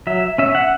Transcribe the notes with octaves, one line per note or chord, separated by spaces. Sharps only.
F#3 E5
C#4 E5
F#5